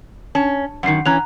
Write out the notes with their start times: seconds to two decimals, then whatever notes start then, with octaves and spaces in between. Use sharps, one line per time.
0.35 C#4 A5
0.83 F#2 D#3 F#5 C7
1.06 E3 C#4 A#5 F#6 F7